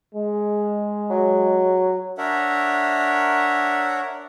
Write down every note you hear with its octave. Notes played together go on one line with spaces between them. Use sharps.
G#3
F#3
D4 A#4 C#5 E5 F#5